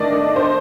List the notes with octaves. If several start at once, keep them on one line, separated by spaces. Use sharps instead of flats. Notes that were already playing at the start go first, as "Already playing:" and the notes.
Already playing: D#3 A3 D4 D5 D#5
C5